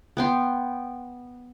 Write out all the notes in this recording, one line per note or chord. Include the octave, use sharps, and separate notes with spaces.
B3 G5 C6